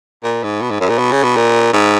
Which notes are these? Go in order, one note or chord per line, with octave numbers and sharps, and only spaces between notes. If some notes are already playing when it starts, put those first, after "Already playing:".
A#2
G#2
B2
G#2
F#2
A#2
B2
C#3
B2
A#2
G#2